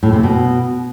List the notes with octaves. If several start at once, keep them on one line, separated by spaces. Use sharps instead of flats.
A2
C3
B2